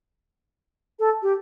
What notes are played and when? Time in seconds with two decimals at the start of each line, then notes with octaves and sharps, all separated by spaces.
0.99 A4
1.22 G4